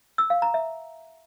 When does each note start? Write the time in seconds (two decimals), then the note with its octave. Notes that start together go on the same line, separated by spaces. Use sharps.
0.18 E6
0.30 F5
0.42 A#5
0.54 E5